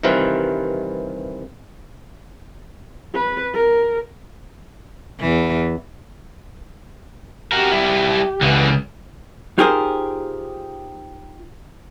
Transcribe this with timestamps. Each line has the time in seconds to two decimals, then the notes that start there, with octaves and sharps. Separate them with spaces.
0.03 G2 C3 D#3 E3 F4 B4
3.15 B4
3.54 A#4
5.20 E2 E3
7.52 F#4 G4 A#4
7.72 G3 E4
8.42 C#2 D3 E3
9.58 D#4 F4 G4 G#4 A#4 C5